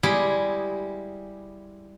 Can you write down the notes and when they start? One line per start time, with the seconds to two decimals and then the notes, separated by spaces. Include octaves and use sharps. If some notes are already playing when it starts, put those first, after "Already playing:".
0.03 G3 G#3 E4 G4 G#4